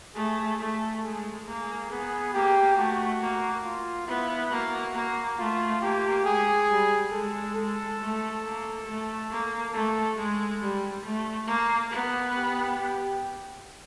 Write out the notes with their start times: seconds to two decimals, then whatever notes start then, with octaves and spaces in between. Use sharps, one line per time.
0.15 A3 G#4
0.59 A3 A4
1.03 G#3 G#4
1.47 A#3
1.61 G#4
1.90 B3 G#4
2.33 A#3 G4
2.77 A3 F#4
3.21 A#3
3.64 F4
4.07 B3 E4
4.51 A#3 F#4
4.94 A#3
5.38 A3 F4
5.82 A#3 G4
6.25 G#3 G#4
6.69 G3
7.12 G#3 A4
7.55 G#3 A4
8.00 A3
8.43 A#3
8.86 A3
9.30 A#3
9.73 A3 A4
10.16 G#3
10.61 G3
11.04 A3
11.47 A#3
11.91 B3
12.34 G4
12.78 G4